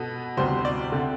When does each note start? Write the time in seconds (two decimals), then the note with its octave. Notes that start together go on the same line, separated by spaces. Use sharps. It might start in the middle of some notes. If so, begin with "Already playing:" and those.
Already playing: B2 B3 A4
0.37 D2 C3 G3 B3 C5
0.65 D5
0.92 D3 A3 C4